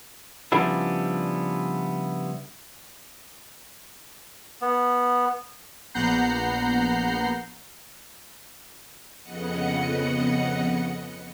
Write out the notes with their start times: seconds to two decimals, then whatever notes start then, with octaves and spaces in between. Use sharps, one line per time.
0.52 C#3 F3 G3 B3 D4 E4
4.61 B3
5.94 A#1 B3 F#5 A#5 G6 C7
9.22 F2 C#3 B3 D#5 F#5 C#7